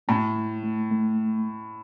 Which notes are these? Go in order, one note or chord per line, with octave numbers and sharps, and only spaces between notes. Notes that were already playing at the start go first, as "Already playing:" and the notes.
A2 A3
A3
A3
A3